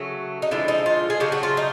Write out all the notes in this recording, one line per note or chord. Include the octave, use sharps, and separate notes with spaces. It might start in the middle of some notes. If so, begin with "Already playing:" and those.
Already playing: C#3 F#3 A3
D#4
D3 F3 G#3 E4
D#4
F4
G#4
C#3 F#3 A3 G4
F#4
F4
D#4